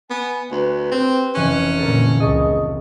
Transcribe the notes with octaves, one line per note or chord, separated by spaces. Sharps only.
B3 G#5
D2 B4
C4 G4
F1 E3 C#4 F#6
A#2 D3 A4 A#4
C#2 C#3 G#4 D#5 A5 C#6